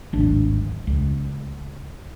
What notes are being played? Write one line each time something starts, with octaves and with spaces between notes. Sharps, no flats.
D1 G#1 D4
C#2